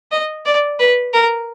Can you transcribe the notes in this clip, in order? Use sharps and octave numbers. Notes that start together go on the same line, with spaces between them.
D#5
D5
B4
A#4